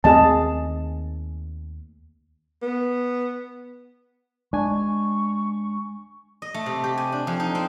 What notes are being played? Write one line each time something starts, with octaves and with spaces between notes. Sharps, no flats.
D#2 A3 C4 G#4 D#5 A5
B3
G#3 D4 G#5 C#6
D#5
A3
C3
G4
G#5
D4
F2
D#4
C4